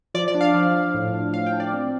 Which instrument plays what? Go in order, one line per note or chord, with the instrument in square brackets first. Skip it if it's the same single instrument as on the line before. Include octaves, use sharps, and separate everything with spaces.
[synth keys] F3 D5
D5
D4
F5
F3
F3
A2
D4
A2 F5
G5
D4
D5
C4